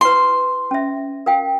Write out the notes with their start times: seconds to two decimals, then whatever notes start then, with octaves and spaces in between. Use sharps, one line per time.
0.01 E4 B4 C6
0.71 C#4 E5
1.26 A#4 F5 G5